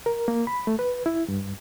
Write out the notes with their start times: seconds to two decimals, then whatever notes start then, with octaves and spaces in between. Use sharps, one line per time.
0.06 A#4
0.28 A#3
0.47 B5
0.67 A3
0.79 B4
1.06 E4
1.28 G2